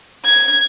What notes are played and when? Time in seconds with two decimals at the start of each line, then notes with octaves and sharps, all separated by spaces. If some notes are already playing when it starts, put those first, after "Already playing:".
0.25 G#6